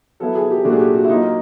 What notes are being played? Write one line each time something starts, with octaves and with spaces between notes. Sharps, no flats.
F#3 B3 E4 A4
G#4
G4
A#2 F#3 A3 D4 F#4
G#4
G4
F#4
E4
F#3 A#3 D#4 F4